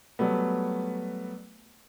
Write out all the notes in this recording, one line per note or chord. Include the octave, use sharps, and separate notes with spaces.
F#3 G3 A3 B3